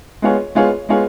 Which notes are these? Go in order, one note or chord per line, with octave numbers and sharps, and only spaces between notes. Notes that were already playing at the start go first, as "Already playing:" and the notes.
G#3 B3 F4 G#4 C#5
G#3 B3 F4 G#4 C#5
G#3 B3 F4 G#4 C#5